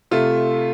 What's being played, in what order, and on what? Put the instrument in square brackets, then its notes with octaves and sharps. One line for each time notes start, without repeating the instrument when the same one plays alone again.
[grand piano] C3 A3 F4